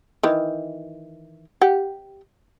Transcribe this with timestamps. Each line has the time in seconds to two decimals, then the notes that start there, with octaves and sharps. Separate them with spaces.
0.23 D#3 E3
1.61 G4 F#5